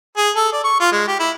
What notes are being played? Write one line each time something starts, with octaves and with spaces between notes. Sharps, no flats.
G#4
A4
D5
C#6
F4
G#3
G4
E4